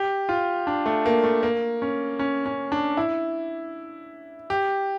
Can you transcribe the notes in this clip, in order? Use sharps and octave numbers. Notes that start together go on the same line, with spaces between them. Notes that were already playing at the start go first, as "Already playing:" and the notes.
Already playing: G4
F4
D4
A3
A#3
A3
A#3
C#4
C#4
C#4
D4
E4
G4